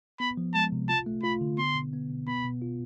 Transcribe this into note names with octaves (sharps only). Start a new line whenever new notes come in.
B3 B5
F3
G#3 A5
C3
F4 A5
A3
F4 B5
D3
B3 C6
B2
B3
B2
B3 B5
B2
F4